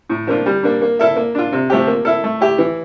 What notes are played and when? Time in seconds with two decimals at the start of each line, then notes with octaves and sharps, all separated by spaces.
0.10 A2
0.27 F3 A#3 D4 F4
0.46 G3
0.63 A#3 D4
0.82 A#3
0.99 E4 A4 E5
1.16 A#3
1.35 D4 F4
1.53 C3
1.70 F3 A3 C4 G4
1.87 A#3
2.05 E4 A4
2.24 A3
2.41 E4 G4
2.58 E3